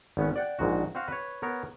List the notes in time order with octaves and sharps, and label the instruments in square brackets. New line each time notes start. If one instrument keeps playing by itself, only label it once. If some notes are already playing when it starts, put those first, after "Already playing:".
[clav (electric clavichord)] G#1 B3 C#4
D5 F#5 G5
A#1 G#2 F#4
C4 F#4 F5
B4 C#5
B3 A#4 C#5